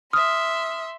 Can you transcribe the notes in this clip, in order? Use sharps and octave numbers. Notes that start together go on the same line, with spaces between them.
E5 C6 D#6 F6